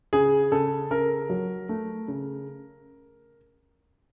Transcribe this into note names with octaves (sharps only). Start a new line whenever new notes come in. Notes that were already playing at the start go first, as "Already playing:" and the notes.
C#3 G#4
C#3 A4
C#3 A#4
F#3
A3
C#3